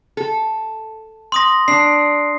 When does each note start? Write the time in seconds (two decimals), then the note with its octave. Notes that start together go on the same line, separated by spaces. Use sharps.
0.17 A4
1.32 C6 D#6 A#6
1.68 D4 C7